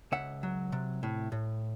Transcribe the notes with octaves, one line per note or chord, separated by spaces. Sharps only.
C#2 E5 F#5
F#3
C3
A2
A2